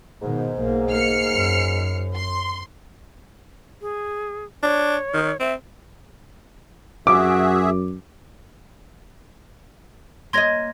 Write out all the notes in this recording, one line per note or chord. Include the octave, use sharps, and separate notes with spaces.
G#2 B2 D#3
B1 A#3
A#3 F6 C7 C#7
F#2
C6
G#4
D4 C#5
D#3
C4 E5
F#2 F#4 G#4 E5 D6
A#3 C#5 D#5 C6 G#6 A#6